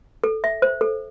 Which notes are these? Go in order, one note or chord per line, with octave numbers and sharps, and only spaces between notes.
A4
E5
C5
A4